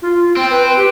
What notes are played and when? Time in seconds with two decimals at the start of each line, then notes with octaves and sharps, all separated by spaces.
0.02 F4
0.37 C4 G5
0.50 B4
0.77 G4